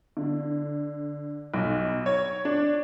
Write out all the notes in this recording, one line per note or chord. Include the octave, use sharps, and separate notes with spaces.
D3
B1
C#5
D4